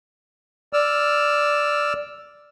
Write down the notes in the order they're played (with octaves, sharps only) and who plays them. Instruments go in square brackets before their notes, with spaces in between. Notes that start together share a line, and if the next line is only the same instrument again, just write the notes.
[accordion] D5 E6 F6